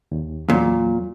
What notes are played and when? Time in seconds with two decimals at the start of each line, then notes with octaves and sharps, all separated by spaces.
0.12 D#2
0.50 E2 A#2 F#3